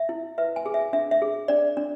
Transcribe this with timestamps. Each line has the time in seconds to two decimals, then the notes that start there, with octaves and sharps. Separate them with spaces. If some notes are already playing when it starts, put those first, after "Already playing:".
Already playing: E5
0.09 E4
0.38 B4 E5
0.56 G#5
0.66 G#4
0.74 E5
0.93 D4 E5
1.11 E5
1.22 G#4
1.48 D4 D5
1.77 D4